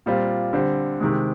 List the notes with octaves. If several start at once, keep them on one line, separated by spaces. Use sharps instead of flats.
A#2 G3 C4 F4
D3 G3 C4
C3 D#3 G#3